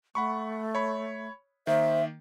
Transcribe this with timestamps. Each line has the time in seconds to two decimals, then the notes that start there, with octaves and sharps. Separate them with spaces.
0.15 A3 F#5 B5 C#6
0.75 C#5 B5
1.67 D#3 A#3 C5 E5